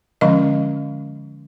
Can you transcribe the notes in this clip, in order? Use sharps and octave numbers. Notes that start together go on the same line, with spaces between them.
D3 F3 G#3 C#4 D#5